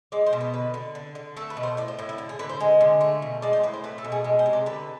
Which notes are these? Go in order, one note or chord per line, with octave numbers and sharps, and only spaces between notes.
G#3 D5
C5
B2
B4
D3 B4
D3
D3
D3
A3 A4
B4
B2
C5
A2 D5
C5
A2 E4
E4
D3
G#4
D3 B4
C5
G#3
D3
A3
B2
G#3 D5
C5
A2 B4
C5
A3 B4
A4
B2
G#4
G#3
C5
C3
D5
D3 B4